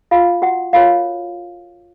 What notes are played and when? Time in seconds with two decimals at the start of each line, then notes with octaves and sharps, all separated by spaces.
0.11 F4 F5
0.42 F#4 F#5
0.73 F4 F#4 A#4 C#5 F5